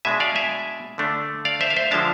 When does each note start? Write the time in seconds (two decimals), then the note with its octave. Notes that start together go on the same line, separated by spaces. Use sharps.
0.05 B2 G#3 D4 E5 G#5
0.20 D5 F5
0.36 E5 G#5
0.98 D3 A3 D4
1.45 D5 F5
1.61 C5 E5
1.70 F5
1.76 C5 E5
1.91 D3 F3 G#3 D4 F5 A5